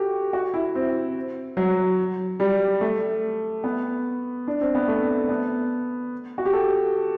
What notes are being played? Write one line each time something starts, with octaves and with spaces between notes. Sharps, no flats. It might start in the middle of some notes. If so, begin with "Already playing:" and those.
Already playing: F#4 G4 A4
F#4
E4
C4
F#3
G3
A3
B3
D4
C4
B3
A3
B3
F#4
G4
A4